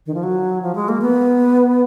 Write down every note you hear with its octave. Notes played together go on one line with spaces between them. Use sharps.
D#3
F3
F#3
F3
G#3
A#3
B3